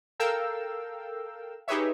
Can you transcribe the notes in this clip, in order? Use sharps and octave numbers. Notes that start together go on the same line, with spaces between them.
A4 A#4 F5 G5 E6
D#4 G4 G#4 B4 C#5 E5